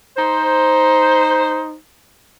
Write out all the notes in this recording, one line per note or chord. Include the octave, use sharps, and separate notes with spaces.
D#4 C5